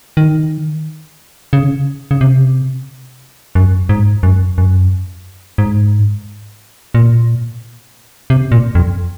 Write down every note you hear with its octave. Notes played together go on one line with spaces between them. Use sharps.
D#3
C#3
C#3
C3
F#2
G#2
F#2
F#2
G#2
A#2
C3
A#2
F2